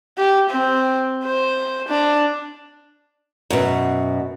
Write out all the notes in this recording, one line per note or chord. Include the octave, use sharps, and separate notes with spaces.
G4
C4
C5
D4
F#2 B2